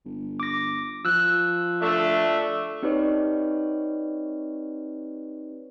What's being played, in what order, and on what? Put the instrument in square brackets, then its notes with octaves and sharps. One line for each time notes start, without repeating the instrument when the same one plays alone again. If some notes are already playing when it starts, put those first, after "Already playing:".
[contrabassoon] G1
[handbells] D6 A#6
[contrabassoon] F3 [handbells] E6 F#6
[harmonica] A3 D4 E5
[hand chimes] C4 D#4 G4 B4 C#5 D5